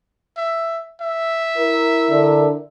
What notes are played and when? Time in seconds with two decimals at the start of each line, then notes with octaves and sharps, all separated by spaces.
0.37 E5
1.01 E5
1.57 E4 A#4
2.10 D3